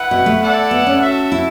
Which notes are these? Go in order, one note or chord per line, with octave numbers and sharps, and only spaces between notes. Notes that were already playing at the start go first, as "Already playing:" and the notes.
Already playing: E4 B4 F#5
B2
A3
E4 A4 D5 F#5
B3
C#4
F#4 A4 E5
E4